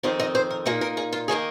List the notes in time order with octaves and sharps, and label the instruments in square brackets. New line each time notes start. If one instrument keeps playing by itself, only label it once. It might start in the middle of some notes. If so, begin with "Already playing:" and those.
[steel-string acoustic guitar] F2 D#3 C4 D#4 C5
D#5
C5
A#4
A#2 A#3 D#4 G#4
A#4
G#4
F4
D#3 A#3 D#4 G#4